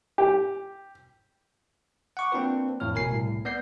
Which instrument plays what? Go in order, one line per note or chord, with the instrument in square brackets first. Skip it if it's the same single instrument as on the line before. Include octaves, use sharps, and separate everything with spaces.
[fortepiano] G4
[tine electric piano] F#5 C#6 D6
A#3 C4 D4 F4 B4
F2 A2 C#5 F6
G1 B2 A#4 G#5 C7
C2 A2
B3 D5 G6 C7